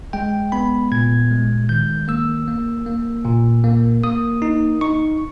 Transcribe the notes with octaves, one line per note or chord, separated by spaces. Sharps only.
G#3 G5
B3 B5
A#2 G#6
G#3
D#3 G6
A#3 E6
A#3
A#3
A#2
A#3
A#3 D#6
D#4
D#4 C#6